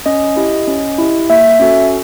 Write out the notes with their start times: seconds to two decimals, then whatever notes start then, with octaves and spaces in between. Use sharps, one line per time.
0.06 C#4 D#5
0.36 E4 G4
0.68 C#4
0.98 E4 G4
1.30 A#3 E5
1.60 C#4 F#4 A4